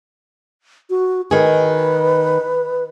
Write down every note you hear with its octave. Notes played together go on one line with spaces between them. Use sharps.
F#4
D#3 G#4 B4